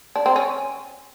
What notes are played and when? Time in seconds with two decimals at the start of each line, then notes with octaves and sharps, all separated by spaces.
0.16 D4
0.26 C4
0.36 C#4